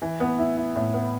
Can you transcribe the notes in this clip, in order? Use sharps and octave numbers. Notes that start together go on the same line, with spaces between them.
E3
B3
E4
E4
A2
B3